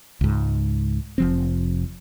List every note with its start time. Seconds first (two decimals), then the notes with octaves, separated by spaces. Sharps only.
0.21 C#2 G#2
1.18 F1 F3 C4